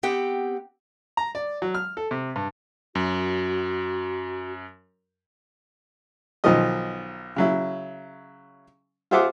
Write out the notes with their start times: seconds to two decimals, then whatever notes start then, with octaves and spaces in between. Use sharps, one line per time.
0.03 B3 C4 G4 F#5 G5
1.17 A#5
1.35 D5
1.62 F#3
1.74 F6
1.97 A4
2.11 C3
2.36 G2
2.95 F#2 F#4
6.44 B1 D#3 F3 D#5
7.36 C#3 F#3 E4
9.11 F4 G#4 C5 E5 F#5 D6